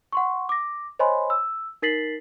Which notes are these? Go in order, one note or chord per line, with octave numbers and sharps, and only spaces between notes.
F#5 C6 C#6
D6 A#6
C5 C#5 D#5 G#5 B5 C6
E6
D#4 A#4 A6 B6 C7 F#7